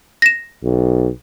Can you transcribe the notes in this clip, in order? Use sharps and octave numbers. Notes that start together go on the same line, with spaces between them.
A#6 E7
B1